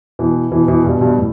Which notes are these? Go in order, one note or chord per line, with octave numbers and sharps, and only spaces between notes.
B2 E3
B2 E3
B2 E3
G2 B2
G2 B2
A2